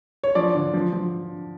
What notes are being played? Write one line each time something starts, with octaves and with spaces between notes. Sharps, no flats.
C#5
F3 D5
D3
F3
F3